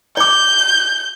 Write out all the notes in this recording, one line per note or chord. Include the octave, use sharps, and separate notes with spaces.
D5 D6 G6